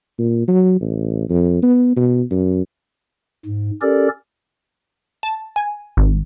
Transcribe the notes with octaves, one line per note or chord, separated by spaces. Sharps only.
A#2
F#3
A1
F2
B3
B2
F#2
G#2
C#4 G4 A4 A#4 D5
A5
G#5
G#1